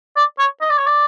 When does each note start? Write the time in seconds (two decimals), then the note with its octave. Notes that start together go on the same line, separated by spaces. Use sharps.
0.16 D5
0.39 C#5
0.61 D#5
0.70 D5
0.78 C#5
0.87 D5